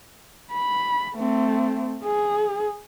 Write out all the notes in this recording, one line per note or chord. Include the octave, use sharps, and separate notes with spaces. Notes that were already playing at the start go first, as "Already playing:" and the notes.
B5
A3 C4
G#4